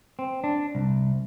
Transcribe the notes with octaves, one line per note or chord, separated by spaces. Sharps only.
C4
D4
C2